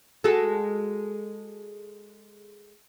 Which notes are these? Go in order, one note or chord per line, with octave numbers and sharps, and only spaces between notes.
G#3 F#4 A4